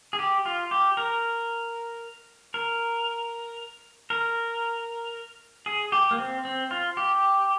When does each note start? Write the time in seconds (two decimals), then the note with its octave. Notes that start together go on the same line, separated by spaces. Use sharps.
0.13 G#4
0.19 G4
0.45 F4
0.71 G4
0.97 A#4
2.54 A#4
4.10 A#4
5.66 G#4
5.92 G4
6.11 A#3
6.19 C4
6.45 C4
6.71 F4
6.97 G4